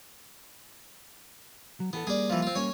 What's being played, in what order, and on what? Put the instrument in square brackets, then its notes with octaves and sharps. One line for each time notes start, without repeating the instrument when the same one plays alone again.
[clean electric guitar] F#3
[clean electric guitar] E3 G#4 A4 [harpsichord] B3
[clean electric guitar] G3 A#3 [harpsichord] G#4 D5
[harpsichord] E3 F3
C4 F4
[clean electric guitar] G3 A#3 C#4 [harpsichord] C#5 G#5